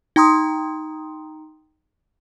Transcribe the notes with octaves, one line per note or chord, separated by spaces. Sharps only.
D#4 G5 A#5 C6 D#6